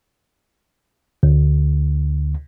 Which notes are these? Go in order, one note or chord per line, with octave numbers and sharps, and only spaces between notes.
D2